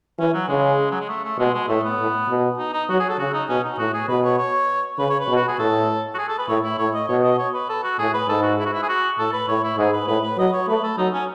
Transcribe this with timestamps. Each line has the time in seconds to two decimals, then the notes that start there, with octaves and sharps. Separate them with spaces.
0.19 E3 C#4
0.33 F#3
0.48 C#3 G#3
0.91 F#3
1.00 G#3
1.09 A3
1.24 A3
1.38 B2 G#3
1.54 G#3
1.68 A2 A3
1.84 B3
1.99 A2
2.29 B2
2.58 D#4
2.73 D#4
2.89 F#3 F#4
2.99 G#4
3.09 A4
3.18 C#3 F#4
3.33 D#4
3.49 B2 C#4
3.64 D#4
3.78 A2 F#4
3.94 G#4
4.08 B2 B4
4.24 C#5
4.38 C#5
4.99 C#3 B4
5.10 C#5
5.20 B4
5.28 B2
5.36 F#4
5.48 G#4
5.59 A2 A4
6.14 F#4
6.18 G#4
6.28 A4
6.38 B4
6.48 A2 C#5
6.63 E4
6.78 A2 C#5
6.94 D#5
7.08 B2 C#5
7.24 D#5
7.38 C#5
7.54 B4
7.69 A4
7.83 F#4
7.99 A2 G#4
8.14 B4
8.28 G#2 A4
8.43 F#4
8.59 E4
8.66 F#4
8.73 E4
8.82 G#4
8.89 F#4
9.18 A2 A4
9.33 B4
9.48 A2 C#5
9.63 E4
9.78 G#2 G#4
9.93 B4
10.08 A2 B4
10.23 B4
10.38 F#3 D#5
10.53 C#5
10.68 A3 B4
10.83 A4
10.98 F#3 D#4
11.14 C#4